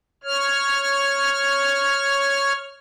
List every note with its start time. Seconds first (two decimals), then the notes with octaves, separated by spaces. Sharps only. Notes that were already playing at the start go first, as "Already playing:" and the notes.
0.24 C#5 F6